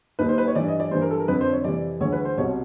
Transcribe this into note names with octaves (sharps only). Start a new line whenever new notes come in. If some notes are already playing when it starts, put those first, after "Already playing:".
D#2 D#3 B4
C5
B4
C#5
G2 E3 D5
D#5
D5
G2 E3 C5
A#4
A4
A#4
F2 D3 B4
C5
C#5
F2 C3 E3 D5
D2 C#3 E3 C#5
B4
C5
C2 B2 C#5